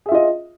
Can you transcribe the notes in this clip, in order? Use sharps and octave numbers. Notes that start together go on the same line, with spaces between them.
F4 G#4 D#5 E5